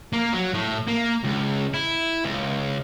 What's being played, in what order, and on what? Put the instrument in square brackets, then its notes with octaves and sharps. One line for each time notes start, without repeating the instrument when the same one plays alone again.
[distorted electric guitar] A#3
F#3
A2
A#3
C#2
E4
C#2